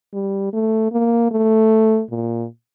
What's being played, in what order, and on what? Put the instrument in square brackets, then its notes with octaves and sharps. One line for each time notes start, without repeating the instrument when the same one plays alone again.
[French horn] G3
A3
A#3
A3
A#2